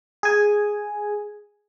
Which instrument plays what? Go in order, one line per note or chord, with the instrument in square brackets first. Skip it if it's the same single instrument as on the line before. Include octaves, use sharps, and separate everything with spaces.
[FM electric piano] G#4 G#5